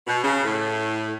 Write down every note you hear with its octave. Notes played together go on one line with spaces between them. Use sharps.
B2
C#3
A2